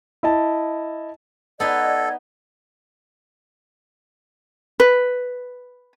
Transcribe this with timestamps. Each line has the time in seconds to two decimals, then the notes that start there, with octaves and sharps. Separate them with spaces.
0.23 E4 D#5 A5
1.60 B3 D#4 A4 B4 D5 D#5 G#6
4.80 B4